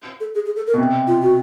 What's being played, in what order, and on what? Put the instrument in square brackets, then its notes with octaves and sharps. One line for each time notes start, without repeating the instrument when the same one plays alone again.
[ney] A4
G#4
G#4
A4
A#4
[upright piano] B2
C3
[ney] F4
F#4